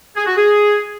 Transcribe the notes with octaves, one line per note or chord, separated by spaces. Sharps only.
G#4
F#4
G#4